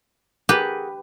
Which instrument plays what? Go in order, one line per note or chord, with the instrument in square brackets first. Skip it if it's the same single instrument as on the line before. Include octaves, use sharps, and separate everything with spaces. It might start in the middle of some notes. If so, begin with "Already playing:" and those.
[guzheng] G4 [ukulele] G#4 A#4 F#5 [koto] B4